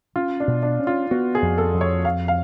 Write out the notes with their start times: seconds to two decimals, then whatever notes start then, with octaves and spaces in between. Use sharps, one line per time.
0.16 C#4 F4
0.40 D4
0.48 B2
0.63 D4
0.79 C#4
0.87 F4
1.11 B3 F#4
1.35 G#4
1.42 F2
1.58 A4
1.74 F2
1.81 C#5
2.05 F2 F5
2.28 F5